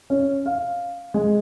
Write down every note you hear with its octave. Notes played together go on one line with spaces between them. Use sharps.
C#4
F5
G#3